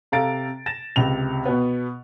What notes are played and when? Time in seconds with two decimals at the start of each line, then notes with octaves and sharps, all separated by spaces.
0.12 C3 A4 F5 A#5 A6 D7
0.66 A6 A#6 E7
0.96 C#2 C3 F7
1.45 B2 B3